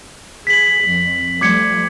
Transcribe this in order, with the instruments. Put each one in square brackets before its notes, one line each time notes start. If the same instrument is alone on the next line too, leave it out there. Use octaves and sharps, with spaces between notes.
[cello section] G#4 [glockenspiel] B6 F#7
[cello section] F2
[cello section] F3 G3 A3 [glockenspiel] D6 G#6 C#7